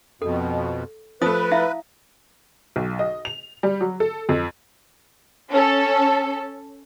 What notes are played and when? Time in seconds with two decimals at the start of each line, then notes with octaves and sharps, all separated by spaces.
0.22 F2 B2 A4
1.22 F3 A3 B4 D#6
1.51 E4 E5 F5
2.76 B1
2.99 D#5
3.25 F7
3.63 G3
3.81 F#3
4.00 A4
4.29 F2
5.50 C#4 A4